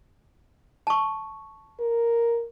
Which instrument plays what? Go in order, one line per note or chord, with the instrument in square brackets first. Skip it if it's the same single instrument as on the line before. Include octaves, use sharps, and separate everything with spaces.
[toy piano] A5 C#6
[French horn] A#4